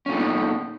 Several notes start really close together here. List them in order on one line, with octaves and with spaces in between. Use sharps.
C#4 A#2 A3 D#4 B3